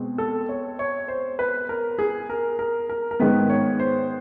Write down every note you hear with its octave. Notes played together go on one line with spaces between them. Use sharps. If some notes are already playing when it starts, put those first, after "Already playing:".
Already playing: B2 G#3 C4
A4
C#5
C#5
C5
B4
A#4
G#4
A#4
A#4
A#4
A#4
G#2 D#3 G#3 B3 B4
C#5
C5